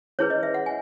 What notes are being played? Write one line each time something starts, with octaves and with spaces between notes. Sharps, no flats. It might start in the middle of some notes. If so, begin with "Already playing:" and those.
C#4 E4 G#4 B4 C#5
D#5
E5
F#5
G#5